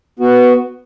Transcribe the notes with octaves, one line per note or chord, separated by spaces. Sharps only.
B3 F#4